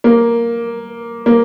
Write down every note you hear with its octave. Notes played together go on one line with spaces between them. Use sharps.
A#3
A#3